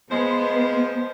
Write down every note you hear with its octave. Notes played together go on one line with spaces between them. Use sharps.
F3 G#3 B3 C5